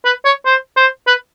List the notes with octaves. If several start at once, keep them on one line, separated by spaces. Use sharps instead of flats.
B4
C#5
C5
C5
B4